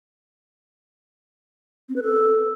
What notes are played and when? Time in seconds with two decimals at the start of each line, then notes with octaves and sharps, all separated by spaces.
1.89 C4
1.96 B4
2.03 A4